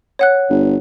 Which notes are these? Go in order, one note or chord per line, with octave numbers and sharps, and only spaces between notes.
C#5 F#5 F#6
G1